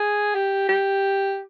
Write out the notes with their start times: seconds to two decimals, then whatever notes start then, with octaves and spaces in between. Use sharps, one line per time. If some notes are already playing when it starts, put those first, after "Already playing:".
Already playing: G#4
0.35 G4
0.69 G4